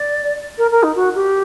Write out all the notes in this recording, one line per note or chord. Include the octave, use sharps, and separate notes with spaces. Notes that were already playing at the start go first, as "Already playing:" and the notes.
Already playing: D5
A#4
A#4
D#4
F#4
G4